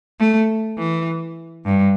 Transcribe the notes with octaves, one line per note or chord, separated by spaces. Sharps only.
A3
E3
G2